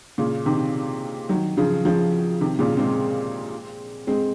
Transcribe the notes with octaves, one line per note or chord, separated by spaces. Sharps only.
A#2 C#3
C3 D#3
D#3 F#3
C#3 F3
C#3 F3
C3 D#3
A#2 C#3
G#3 C4
G#3 C4